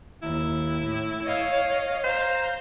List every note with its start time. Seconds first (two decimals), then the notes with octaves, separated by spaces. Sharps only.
0.22 D#2 E4
0.84 A2
1.23 C#5 D#5 F5
2.04 C5 F5 A#5